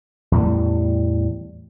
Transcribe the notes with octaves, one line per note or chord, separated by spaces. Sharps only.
E2 A2 G3